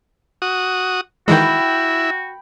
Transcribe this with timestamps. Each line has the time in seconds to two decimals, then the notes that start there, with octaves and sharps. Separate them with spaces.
0.42 F#4 D#6
1.28 D#3 E3 G#3 E4 F#4 G5 B5